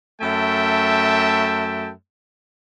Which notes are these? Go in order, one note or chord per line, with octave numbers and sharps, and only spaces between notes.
F#2 A3 E5 G5 A5